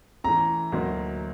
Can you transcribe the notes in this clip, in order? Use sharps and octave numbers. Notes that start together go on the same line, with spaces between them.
E3 A3 C#4 A#5
D2 D3 F#3 A#3 D#4